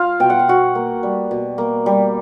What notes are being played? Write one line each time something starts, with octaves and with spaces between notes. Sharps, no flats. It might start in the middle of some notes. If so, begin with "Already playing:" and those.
Already playing: F4 F5
B2 G5
F#5
F5
B2 F#4 F#5
A#3
G3
B2
A#3
G3